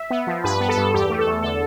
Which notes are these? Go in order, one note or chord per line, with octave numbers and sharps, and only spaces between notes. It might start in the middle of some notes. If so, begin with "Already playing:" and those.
Already playing: E5
B3
F3
G2 B4
B3
A4
G2
E2 G4
A3
A4
E2
D3 A4